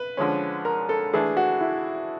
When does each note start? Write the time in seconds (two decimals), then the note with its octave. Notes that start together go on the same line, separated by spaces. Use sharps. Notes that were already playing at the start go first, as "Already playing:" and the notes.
Already playing: B4
0.17 D3 F3 G#3 C#4
0.65 A#4
0.89 A4
1.13 E3 A3 D4 G#4
1.37 F#4
1.61 E4